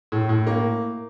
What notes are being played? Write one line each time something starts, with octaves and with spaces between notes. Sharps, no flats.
A2
A2
A#3